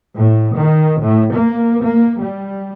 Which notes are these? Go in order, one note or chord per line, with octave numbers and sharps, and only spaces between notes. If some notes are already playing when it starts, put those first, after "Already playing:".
A2
D#3
A2
A#3
A#3
G3